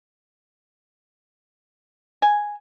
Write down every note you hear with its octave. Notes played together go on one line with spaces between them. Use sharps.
G#5